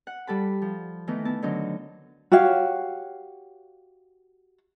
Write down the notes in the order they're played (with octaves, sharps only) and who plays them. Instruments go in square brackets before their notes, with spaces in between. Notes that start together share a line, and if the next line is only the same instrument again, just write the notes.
[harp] F#5
G3 A4 A5 B5
F3
D#3 E3 A3 B3 D#4
B3 E4 A5
D3 D#3 F#3 D4 D#4
[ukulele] F#4 G4 C#5 F5